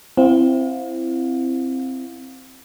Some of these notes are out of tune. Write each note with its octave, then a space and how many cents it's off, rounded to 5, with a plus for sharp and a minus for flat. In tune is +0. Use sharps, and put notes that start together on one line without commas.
C4 +0 E4 +20 F5 +40